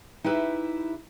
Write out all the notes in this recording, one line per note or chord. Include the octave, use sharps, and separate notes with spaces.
D#4 E4 G4 B4 E5